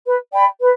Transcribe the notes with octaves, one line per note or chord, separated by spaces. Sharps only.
B4
D5 G5 B5
B4